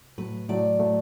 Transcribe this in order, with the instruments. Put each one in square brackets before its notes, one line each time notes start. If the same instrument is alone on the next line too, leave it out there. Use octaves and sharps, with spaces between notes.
[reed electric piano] A2 F#3 A3 [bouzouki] B4
[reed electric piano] A2 F#3 A3 [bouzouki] D5
[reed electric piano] A2 F#3 A3